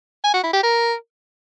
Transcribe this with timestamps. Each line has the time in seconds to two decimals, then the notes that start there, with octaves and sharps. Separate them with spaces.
0.24 G#5
0.34 F#4
0.44 E4
0.53 G4
0.63 A#4